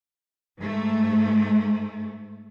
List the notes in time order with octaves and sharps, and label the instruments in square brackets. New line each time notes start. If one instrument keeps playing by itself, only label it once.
[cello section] G#2 A3